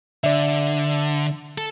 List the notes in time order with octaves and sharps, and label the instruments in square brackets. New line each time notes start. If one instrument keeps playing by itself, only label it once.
[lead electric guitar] D3 [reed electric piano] D5 E5
[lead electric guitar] A4